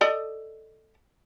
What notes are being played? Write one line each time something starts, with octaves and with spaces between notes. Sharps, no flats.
A4 D5 D#5